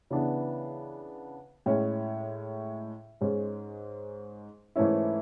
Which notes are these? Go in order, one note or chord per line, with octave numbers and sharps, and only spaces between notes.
C#3 E3 B3 D4
A2 G#3 C#4
G#2 G#3 C#4 G#4
G#2 E3 A3 C#4 E4